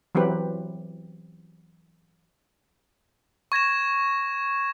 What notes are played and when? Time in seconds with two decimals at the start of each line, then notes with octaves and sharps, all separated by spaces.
0.15 E3 F#3 C4 G4 B4
3.52 C#6 G#6 A#6 E7